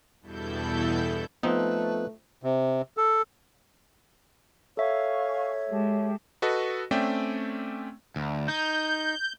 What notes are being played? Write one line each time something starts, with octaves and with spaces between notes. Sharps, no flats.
E2 G2 B2 E4 A4 G6
F3 A3 B3 C4 D#4 B4
C3
A4
A4 C#5 E5 F5 G#5 C#6
G#3 G4 A5
F#4 A4 B4 D#5
A3 C4 C#4 D5 E5 G5
D2
D#4 G6